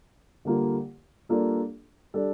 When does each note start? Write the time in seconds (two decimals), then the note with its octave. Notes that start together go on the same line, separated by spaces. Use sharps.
0.45 D3 G3 A#3 F4
1.29 G3 A#3 D4 F4 A4
2.14 G3 D4 A4